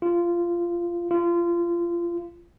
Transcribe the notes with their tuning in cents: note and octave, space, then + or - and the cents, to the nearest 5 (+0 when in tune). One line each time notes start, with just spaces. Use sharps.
F4 -15
F4 -25